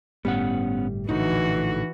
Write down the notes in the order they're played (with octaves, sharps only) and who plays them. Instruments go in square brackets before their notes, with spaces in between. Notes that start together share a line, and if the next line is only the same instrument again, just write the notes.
[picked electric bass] G1 A2 G3 [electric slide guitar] B3 C#4 F#5
[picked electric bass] A#1 A2 D3 [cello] E3 F#4 [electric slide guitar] D#4